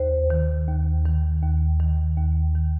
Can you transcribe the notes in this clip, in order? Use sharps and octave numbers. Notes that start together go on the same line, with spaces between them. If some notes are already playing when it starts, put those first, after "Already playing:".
Already playing: D#2 C5
D#3
D#2
D#3
D#2
D#3
D#2
D#3